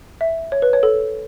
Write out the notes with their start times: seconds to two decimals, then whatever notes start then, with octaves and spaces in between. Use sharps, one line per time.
0.21 E5
0.52 C#5
0.62 B4
0.73 C#5
0.83 A4